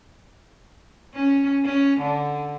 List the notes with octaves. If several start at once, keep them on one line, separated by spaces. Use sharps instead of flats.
C#4
C#4
D3